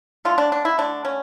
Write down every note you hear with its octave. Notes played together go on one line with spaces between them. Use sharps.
D3 A3 F4
D4
D4
E4
D3 A3 D4
C#4